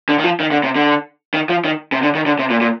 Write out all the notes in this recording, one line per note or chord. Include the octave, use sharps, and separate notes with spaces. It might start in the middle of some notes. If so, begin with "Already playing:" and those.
D3
D#3
F3
D#3
D3
C3
D3
D#3
F3
D#3
C3
D3
D#3
D3
C3
A#2
A#2